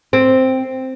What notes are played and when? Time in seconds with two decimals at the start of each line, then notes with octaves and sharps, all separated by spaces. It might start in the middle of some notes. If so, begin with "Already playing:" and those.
0.13 C4